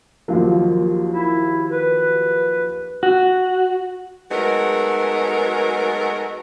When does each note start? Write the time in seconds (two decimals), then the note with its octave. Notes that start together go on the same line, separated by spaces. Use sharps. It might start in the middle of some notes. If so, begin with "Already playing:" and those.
0.28 D#2 F3 F#3
1.12 E4
1.68 B4
3.03 F#4
4.31 F#3 G#3 A3 B3 D#4 A#4